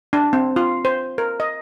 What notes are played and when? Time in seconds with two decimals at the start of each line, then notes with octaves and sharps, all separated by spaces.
0.13 D4
0.33 C4
0.56 F4
0.85 C5
1.18 A#4
1.40 D#5